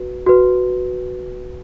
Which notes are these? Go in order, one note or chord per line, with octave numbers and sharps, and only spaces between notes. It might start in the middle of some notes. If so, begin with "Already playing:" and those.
Already playing: F#4 B4
F#4 B4